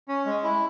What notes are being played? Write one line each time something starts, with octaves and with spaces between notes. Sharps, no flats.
C#4
G#3
E4